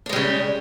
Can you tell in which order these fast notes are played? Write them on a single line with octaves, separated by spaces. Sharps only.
D4 G#3 G3 C#3